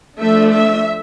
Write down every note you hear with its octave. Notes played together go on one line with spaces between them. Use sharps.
F3 A3 D4 E5
E5